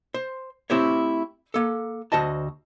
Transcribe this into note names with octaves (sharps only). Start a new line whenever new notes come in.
C5
A3 C4 E4 G4 C5 C#5
A#3 A4
D2 F#4 C5 D#5 A5